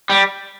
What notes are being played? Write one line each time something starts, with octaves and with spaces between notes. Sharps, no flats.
G3